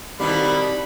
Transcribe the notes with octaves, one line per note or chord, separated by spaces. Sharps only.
C2 B2 D#3 G3 A#3 B5